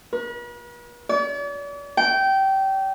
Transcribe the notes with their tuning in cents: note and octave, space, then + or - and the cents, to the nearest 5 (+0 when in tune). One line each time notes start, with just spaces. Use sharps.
B4 -45
D5 -45
G5 -20